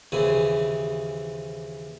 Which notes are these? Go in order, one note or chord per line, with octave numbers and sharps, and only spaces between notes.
D#2 C#3 E3 C4 G#5